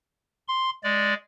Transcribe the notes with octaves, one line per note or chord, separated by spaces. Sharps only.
C6
G#3 D5